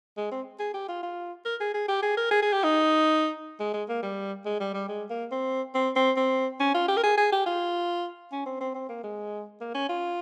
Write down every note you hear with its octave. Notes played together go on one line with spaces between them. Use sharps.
G#3
C4
G#4
G4
F4
F4
A#4
G#4
G#4
G4
G#4
A#4
G#4
G#4
G4
D#4
G#3
G#3
A#3
G3
G#3
G3
G3
G#3
A#3
C4
C4
C4
C4
C#4
F4
G4
A#4
G#4
G#4
G4
F4
C#4
C4
C4
C4
A#3
G#3
A#3
C#4
F4